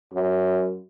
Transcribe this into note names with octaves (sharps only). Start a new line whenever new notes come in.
F#2